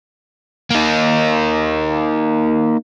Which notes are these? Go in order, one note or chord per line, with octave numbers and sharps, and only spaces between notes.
A#3 D#4